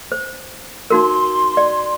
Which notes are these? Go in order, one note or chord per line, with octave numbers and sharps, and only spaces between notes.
C5
D#4 F#4 A#4 C6
D5